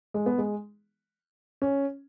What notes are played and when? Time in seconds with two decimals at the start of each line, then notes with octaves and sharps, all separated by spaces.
0.14 G#3
0.26 B3
0.38 G#3
1.62 C#4